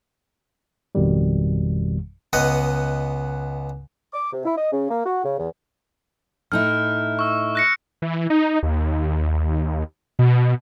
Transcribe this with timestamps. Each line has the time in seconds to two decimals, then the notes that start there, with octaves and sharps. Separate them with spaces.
0.95 G#1 F2 B2 D#3 G3
2.33 C#2 B3 D#5 F#5
4.14 D6
4.33 C3
4.45 E4
4.58 D#5
4.72 C#3
4.90 A#3
5.06 F#4
5.25 C#3
5.39 E2
6.52 A2 D#4 E4 F6
7.19 C#6 E6
7.55 F#6 A#6 C#7
8.02 E3
8.30 D#4
8.63 D#2
10.19 B2